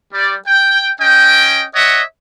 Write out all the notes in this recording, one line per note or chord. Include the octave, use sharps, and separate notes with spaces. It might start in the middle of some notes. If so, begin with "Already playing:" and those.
G3 D5
G5
C#4 D#5 G5
C#5 D#5 E5 F#5